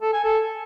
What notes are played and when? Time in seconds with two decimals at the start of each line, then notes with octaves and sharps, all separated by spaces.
0.02 A4
0.13 G#5
0.24 A4